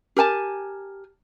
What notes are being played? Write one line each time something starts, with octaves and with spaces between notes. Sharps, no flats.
G4 A#4 G#5 A5